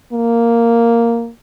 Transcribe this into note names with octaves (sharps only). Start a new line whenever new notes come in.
A#3